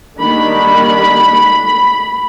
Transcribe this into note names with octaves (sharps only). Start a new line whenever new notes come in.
D#3 G3 A#3 D4 B5